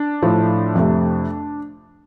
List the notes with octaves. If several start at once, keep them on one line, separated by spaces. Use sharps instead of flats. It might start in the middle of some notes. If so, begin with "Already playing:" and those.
Already playing: D4
A2 F3 A3
F2 C3 A3